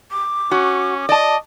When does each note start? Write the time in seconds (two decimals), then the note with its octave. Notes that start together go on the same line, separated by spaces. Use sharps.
0.11 D6
0.51 C#4 F#4
1.09 D5 D#5 A5